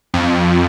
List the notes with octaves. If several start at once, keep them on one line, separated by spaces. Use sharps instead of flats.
F2